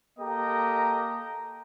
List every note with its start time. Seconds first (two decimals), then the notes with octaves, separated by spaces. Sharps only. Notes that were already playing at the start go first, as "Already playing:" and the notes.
0.19 A#3 G4 A4 D#5 G5 A#5